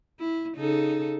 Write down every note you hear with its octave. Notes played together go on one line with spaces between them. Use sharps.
E4
C#3 D#4 A4